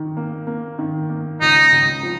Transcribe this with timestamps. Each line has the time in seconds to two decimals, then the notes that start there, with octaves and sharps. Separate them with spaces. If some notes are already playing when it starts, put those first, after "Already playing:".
Already playing: D#3
0.17 A#3
0.47 A#3
0.79 D#3
1.10 A#3
1.41 C#2 D#4
1.72 C#2
2.03 F3